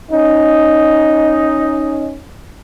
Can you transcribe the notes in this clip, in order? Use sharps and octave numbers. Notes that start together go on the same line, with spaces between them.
C#4 D#4